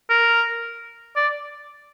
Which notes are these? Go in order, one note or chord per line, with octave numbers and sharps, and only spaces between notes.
A#4
D5